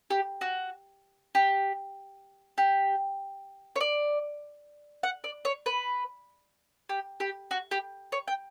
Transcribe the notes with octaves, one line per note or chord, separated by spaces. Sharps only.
G4
F#4
G4
G4
C#5
D5
F#5
D5
C#5
B4
G4
G4
F#4
G4
C#5
G5